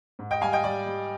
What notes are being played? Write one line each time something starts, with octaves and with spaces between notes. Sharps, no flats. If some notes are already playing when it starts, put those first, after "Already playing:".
G#2
D#5 G5
G3 F5 G#5
D#5 G5
G3 D5
G3